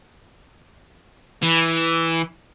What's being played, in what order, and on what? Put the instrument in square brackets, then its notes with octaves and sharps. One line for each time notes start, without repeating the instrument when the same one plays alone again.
[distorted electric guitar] E3